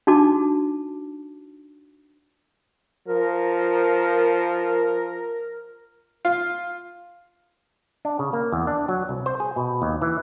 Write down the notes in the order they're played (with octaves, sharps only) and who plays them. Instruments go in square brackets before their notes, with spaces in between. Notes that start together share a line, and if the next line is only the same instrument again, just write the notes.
[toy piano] D4 D#4 F#4 A5 D6
[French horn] F3 [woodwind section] A#4
[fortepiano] F4
[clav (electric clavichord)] D4
C#3
A#3
E2
D4
F#3
C2
C5
G#4
B2
D#2
E3